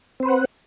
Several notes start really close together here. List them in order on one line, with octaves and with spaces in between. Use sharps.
C4 C5 B4 F#5